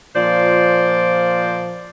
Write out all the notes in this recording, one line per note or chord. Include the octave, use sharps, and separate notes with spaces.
A#2 F3 C5 D5